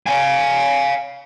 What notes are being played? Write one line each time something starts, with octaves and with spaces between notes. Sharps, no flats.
F5 G#5